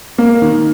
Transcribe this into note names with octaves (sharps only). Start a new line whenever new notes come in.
A#3
D#3